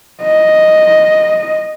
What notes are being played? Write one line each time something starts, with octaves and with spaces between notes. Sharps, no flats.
D#5